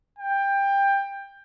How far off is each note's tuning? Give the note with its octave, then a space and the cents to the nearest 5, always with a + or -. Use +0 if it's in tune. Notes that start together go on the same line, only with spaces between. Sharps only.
G5 +15